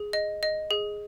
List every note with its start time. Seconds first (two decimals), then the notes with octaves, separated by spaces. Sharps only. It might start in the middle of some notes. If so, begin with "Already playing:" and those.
Already playing: G#4
0.13 D#5
0.43 D#5
0.71 G#4